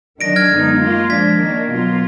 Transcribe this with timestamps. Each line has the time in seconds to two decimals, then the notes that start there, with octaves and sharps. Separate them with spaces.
0.21 D#3 F#3 D4 A#6 D7
0.36 F6 G#6
0.51 F#2 D3 G#3 B3 D#4
0.80 D#3 A#3 F4
1.09 F3 G#3 D4 G#6 B6
1.39 D#3 A#3 D4
1.69 B2 F#3 A#3 F4